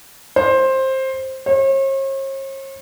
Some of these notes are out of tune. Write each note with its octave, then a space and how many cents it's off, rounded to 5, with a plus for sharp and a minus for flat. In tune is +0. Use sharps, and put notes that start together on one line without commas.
C5 +15
C#5 -45